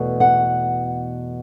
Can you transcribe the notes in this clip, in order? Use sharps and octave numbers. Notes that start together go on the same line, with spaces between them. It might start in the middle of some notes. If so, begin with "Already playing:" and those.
Already playing: E2 B2 A3
F#5